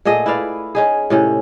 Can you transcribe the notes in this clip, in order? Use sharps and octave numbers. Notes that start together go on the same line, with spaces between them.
A#2 A3 G#4 D#5
E4 B4 D5 F5
C#4 D#4 G#4
A2 C3 C#4